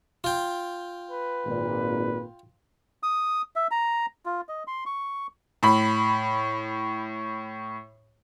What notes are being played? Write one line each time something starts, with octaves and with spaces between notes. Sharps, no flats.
F4 G5
B4
G#1 A#2
D#6
E5
A#5
F4
D#5
C6
C#6
A2 B5